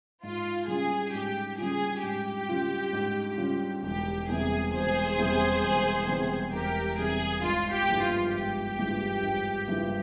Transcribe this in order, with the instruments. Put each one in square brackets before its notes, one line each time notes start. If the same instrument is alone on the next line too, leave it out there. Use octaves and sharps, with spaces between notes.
[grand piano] G#2 [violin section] F4
[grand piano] G3 C#4 F4 [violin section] G#4
[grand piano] G#2 [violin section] G4
[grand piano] G3 C#4 F4 [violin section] G#4
[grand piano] G#2 [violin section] G4
[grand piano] G3 C#4 F4
G#2
G3 C#4 F4
[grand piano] E1 [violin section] G4
[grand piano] E2 C3 G3 [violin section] G#4
[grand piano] E1 [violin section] G#4 C5
[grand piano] E2 C3 G3
E1
E2 C3 G3
[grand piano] E1 [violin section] G4 A#4
[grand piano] E2 C3 G3 [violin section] G#4
[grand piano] G#1 [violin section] F4
[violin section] G4
[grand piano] G2 F3 G#3 E4
[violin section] F4
[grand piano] G#1 [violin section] G4
[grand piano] G2 F3 G#3 E4
G#1
G2 F3 G#3 E4